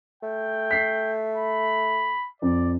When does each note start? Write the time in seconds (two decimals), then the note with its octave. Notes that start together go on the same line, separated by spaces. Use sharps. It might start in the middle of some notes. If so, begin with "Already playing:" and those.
0.23 A3 G5
0.71 B6 C7
1.36 B5
2.42 F2 D5